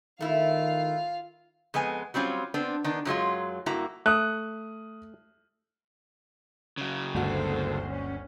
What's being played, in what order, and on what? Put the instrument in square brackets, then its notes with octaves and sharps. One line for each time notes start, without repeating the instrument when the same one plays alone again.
[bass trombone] D#3 [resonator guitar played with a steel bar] A3 E4 [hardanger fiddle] F4 F5
[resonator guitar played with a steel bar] F2 G#3 B3 G#5
F#3 G3 C4 C#4 F4
B3 C4 D4
D#3 B3 D4
F#2 F#3 G#3 F4
G2 A#3 E4 F#4 A#5
[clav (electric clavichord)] A3 [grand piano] D#6 F#6
[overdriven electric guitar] C#3 F#3
[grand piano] G1 D2 F#4 [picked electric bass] D3 G#3 A#3 [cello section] A4 C5
[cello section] C#4